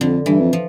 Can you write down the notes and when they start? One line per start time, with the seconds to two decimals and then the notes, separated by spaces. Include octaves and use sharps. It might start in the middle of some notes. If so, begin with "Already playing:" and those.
0.01 F2 D3
0.26 G2 E3
0.40 F2
0.53 F3